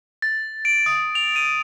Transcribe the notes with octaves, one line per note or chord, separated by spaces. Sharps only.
A6
D7
D#6
F7
D#7